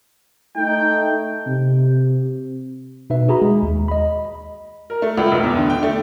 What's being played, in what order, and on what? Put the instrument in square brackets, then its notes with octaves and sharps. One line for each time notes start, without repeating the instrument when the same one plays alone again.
[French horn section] A3 D#4 [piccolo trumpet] G5
[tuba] C3
[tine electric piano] B2 D#4 B4 E5
F#4 G#4 A#5 B5
G#3
D#2
D#5 B5
[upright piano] A#4
A3
C#2
F1
E2
D3
G5
A3